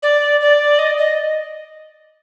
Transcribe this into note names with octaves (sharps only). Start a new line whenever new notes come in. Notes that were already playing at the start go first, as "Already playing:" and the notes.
D5
D5
D#5
D#5